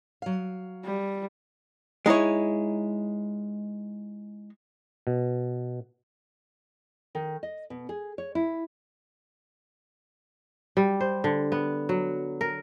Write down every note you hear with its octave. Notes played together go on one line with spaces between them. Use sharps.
F#3 F5
G3
G#3 D#4 E4 C#5
B2
D#3
D#5
B2
G#4
C#5
E4
G3
C5
D3
B3
F#3
A#4